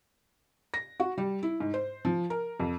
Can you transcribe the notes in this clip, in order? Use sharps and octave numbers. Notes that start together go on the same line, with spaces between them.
A#6
F#4
G3
E4
G#2
C5
F3
A#4
F2